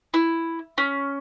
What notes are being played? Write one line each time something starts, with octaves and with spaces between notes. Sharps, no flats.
E4
C#4